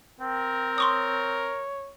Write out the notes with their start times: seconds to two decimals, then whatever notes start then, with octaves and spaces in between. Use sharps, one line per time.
0.21 C4 A#4 G5
0.78 C#5 C6 C#6 D#6